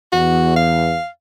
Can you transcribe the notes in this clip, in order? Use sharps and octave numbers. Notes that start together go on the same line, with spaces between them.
E2 F#4
F5